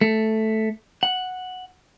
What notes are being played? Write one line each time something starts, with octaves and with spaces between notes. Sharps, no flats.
A3
F#5